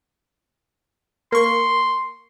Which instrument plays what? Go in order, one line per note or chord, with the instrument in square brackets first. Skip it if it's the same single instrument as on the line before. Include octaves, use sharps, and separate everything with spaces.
[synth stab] A#3 C#6 [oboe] C6